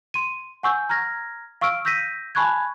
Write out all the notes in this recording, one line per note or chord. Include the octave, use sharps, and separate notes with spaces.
C6 D#7
F#5 G#5 C#6 E6 G6
A#5 F6 G#6 A#6
F5 C#6 E6 F6 D7
E6 G6 A#6 B6 D#7
G#5 A5 B5 C#6 F#6 G#6